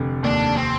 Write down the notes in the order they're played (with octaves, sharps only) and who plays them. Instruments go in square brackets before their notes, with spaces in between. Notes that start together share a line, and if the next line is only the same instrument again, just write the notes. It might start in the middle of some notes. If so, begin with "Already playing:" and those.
Already playing: [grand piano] F1 D3
[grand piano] D#2 [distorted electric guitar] D4
[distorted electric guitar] C4